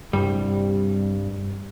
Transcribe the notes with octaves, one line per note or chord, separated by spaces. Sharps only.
C2 G2 G3